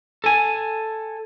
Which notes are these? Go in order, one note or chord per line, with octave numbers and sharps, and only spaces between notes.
A4 G#5